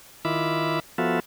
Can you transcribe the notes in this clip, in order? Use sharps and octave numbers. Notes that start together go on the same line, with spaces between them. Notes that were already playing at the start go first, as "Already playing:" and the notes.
D#3 E4 F4 E5 B5 D6
F3 B3 F4 F#4 A4 E5